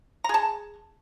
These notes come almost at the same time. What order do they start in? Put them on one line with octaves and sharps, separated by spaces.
A#5 G#4 A5